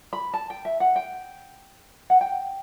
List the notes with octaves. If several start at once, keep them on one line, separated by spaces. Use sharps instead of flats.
B5
A5
G5
E5
F#5
G5
F#5
G5